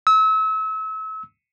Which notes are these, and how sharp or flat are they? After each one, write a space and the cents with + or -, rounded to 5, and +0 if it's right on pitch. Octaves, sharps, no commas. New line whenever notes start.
E6 -35